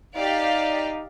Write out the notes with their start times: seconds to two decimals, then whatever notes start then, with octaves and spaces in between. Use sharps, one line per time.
0.17 D#4 G4 D5 F5